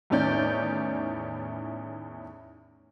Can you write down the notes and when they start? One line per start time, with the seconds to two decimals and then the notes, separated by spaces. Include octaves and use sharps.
0.10 E2 A2 D#3 C#4 D5 G6